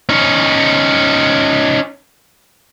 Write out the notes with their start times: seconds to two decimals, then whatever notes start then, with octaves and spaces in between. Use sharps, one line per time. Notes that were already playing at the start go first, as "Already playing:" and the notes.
0.09 C#4 D#4